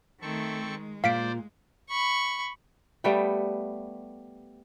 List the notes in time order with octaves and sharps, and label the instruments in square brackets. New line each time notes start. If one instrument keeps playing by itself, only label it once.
[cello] D#3 A3 [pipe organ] C4 A4 C#6
[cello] G#3
[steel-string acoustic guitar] A#2 [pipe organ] C5 D5 [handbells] F5 B6 D7
[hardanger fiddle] B5 C#6
[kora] G3 A3 B3 G5